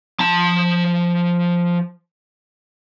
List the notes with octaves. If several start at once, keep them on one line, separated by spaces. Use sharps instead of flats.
F3 A5